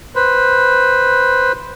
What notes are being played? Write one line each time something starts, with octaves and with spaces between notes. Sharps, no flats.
B4 C5